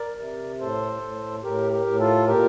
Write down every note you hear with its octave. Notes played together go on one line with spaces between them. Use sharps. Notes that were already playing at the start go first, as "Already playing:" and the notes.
Already playing: A#4 D5
C3
A2 A4 C5
A2
A2 G4 A#4
G4 A#4
A2
F4 A4
A#2 G4 A#4